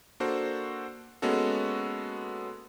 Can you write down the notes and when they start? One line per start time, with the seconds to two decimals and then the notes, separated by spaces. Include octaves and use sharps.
0.20 A#3 D4 F#4 A4 C5
1.22 G#3 A#3 B3 C#4 F#4 A4